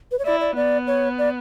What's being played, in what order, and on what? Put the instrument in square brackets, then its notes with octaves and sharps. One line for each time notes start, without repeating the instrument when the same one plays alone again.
[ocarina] B4
C#5
[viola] E4 [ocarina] D5
[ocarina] D5
[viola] B3 [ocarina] D5
[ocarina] C#5
D5